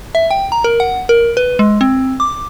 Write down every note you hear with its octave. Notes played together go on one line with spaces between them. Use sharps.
E5
G5
A#5
A#4
F#5
A#4
B4
G#3
C4
D6